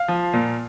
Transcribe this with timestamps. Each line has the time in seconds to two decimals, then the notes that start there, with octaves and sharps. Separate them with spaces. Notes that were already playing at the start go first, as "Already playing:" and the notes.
Already playing: F5
0.08 F3
0.33 A#2